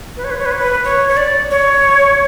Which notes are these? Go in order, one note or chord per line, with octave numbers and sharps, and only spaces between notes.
B4
C#5
B4
C#5
B4
C#5
B4
C#5
C#5
D5
C#5